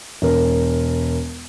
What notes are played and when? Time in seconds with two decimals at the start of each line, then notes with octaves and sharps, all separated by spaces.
0.22 E1 A#4